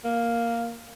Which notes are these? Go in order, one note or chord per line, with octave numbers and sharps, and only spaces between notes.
A#3